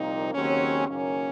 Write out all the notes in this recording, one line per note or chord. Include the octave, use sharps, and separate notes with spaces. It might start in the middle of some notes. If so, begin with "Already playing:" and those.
Already playing: C2 A#2 F3 A#3 C4 D#4
D#2 C#3 F#3 C4 C#4
F#1 F#2 D#3 A#3 C#4